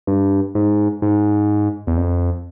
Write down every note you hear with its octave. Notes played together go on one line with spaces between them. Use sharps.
G2
G#2
G#2
E2
F2